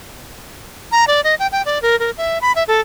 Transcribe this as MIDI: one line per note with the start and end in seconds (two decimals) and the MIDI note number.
0.92 1.05 82
1.08 1.21 74
1.24 1.35 75
1.39 1.47 79
1.52 1.62 79
1.66 1.81 74
1.82 1.98 70
1.99 2.11 70
2.18 2.38 76
2.42 2.52 83
2.56 2.64 76
2.68 2.80 69